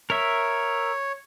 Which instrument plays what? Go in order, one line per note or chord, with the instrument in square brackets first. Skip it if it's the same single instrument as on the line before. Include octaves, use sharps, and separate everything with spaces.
[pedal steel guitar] A#4 E5 [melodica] C#5